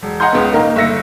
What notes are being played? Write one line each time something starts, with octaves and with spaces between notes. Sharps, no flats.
E1
D#5 F#5 G#5 A#5 C6 G6
C#2 C#3 B3
D#3 A#3 D#4
G1 A3 E5 A#6 C#7